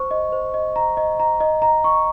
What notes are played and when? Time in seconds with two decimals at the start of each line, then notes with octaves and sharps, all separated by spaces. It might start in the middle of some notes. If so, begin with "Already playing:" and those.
Already playing: C5 C#6
0.11 D#5
0.32 C5
0.54 D#5
0.76 A#5
0.97 D#5
1.20 A#5
1.40 D#5
1.62 A#5
1.84 C#6